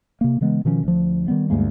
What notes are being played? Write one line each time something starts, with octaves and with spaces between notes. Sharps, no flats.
C3 A#3
C#3 E3 G#3 B3
B2 D#3 F3 C#4
D2 F3
D#3 G3 B3
D2 G2 G#3 A#3